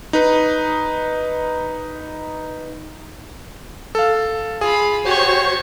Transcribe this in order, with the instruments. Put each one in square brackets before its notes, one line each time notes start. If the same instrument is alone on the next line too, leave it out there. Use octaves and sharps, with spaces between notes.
[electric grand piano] D#4 B4
A4 F5
[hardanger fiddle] F4 B5 [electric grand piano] G#4
[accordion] F#4 C5 C#5 [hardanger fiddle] G4 C#6